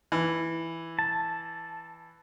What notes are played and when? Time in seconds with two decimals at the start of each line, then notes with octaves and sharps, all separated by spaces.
0.12 E3
0.99 A5